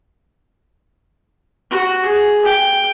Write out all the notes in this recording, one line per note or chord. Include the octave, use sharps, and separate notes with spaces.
F#4
G#4
G5